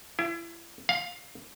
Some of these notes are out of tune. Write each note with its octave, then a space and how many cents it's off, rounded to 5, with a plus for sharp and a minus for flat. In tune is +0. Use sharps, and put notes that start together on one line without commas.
E4 +35
F5 +15